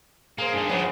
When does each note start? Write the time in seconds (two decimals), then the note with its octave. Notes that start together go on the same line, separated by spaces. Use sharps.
0.38 A#3 G#4 C5
0.53 G2 D#3
0.69 C#3 F3 G#3 B3 C4